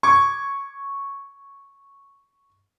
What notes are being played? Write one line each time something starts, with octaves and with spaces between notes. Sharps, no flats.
C#6 D6 G#6